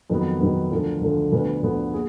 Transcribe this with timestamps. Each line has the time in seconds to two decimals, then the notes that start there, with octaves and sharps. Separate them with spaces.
0.10 F2 D#3 F#3 B3 B4
0.41 F2 D#3 F#3 B3
0.71 D2 D3 F3 A#4
1.01 D2 D3 F3
1.32 D2 D3 F3 B3 B4
1.63 D2 D3 F3 B3
1.93 A#2 G#4